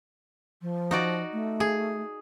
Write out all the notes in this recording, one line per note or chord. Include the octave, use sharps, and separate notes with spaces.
F3
D#4 F#4 D5
A3
G#4